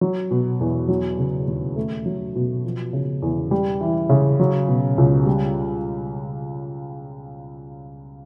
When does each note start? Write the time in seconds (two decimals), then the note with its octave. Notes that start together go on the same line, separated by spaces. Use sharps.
0.01 F#3
0.31 B2
0.60 E2
0.88 F#3
1.19 C#3
1.47 D#2
1.76 A3
2.06 F#3
2.36 B2
2.65 F3
2.93 C#3
3.22 E2
3.51 G3
3.81 E3
4.09 C#3
4.40 F#3
4.68 B2
4.98 C#2
5.26 G3